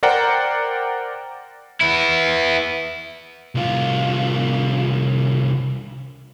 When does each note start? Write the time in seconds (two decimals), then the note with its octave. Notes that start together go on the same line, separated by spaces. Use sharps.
0.03 A#4 C5 D5 F#5 G5 A#5
1.81 B3 E4
3.55 C2 F4